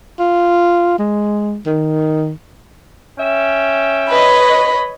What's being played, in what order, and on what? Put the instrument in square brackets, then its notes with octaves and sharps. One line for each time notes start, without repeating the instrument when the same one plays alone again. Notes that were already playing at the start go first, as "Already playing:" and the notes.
[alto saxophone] F4
G#3
D#3
[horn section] C#4 E5 G5
[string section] B4 C#5 D#5 [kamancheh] B5